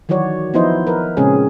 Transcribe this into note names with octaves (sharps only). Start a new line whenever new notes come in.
D#3 E3 F#3 F#4 C#5 D5
F3 B3 D#4 E4 C5 D#5
A#4 B4
A#2 C#3 G#3 C4 C#4 G#4